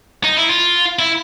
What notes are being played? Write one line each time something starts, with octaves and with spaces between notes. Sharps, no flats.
D#4
E4
F4
E4